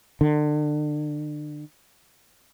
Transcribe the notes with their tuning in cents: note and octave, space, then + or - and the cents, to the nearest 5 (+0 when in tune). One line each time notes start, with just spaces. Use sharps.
D3 +35